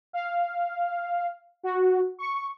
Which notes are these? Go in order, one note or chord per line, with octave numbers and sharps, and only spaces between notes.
F5
F#4
C#6